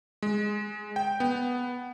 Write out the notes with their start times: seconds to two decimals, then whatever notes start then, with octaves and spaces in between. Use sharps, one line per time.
0.22 G#3
0.96 G5
1.20 B3